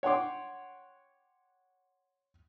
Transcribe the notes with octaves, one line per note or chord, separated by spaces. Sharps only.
C#5 F#5 G5 C6 D6